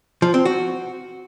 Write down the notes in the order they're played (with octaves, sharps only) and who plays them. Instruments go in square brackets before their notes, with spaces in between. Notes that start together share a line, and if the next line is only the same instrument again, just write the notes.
[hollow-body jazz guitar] F3
C4
F#4